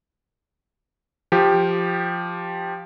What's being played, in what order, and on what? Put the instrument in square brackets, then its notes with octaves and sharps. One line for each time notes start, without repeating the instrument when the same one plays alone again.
[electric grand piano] F3 G4